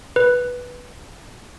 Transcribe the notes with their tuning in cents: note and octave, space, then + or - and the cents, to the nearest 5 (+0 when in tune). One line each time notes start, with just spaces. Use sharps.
B4 -5